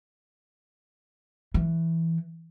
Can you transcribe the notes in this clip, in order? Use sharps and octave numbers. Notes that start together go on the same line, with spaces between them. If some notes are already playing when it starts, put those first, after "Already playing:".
E3